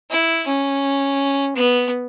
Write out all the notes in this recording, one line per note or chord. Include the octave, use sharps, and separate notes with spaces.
E4
C#4
B3